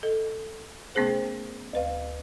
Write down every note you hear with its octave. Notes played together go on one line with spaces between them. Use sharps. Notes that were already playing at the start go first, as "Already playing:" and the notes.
A4 D#5
C3 A3 B3 C#4 G#4 C5
D2 B4 F5